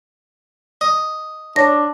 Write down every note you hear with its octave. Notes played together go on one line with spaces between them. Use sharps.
D#5
D4 C#5 A#6